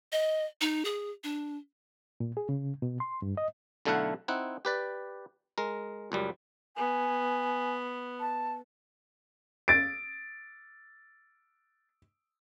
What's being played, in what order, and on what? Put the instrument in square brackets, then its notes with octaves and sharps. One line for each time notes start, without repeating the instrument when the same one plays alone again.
[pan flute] D#5
D#4
G#4
D4
[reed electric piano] A#2
G#4
C#3
B2
C6
G2
D#5
[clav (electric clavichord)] B1 D3 A3 E4 F5 F#5
C4 D#4 E4 F#5
G4 B4 D5
G#3 A#4
C#2 F#2 G3
[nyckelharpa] B3 [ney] G#5
[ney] A5
[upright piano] A6 D7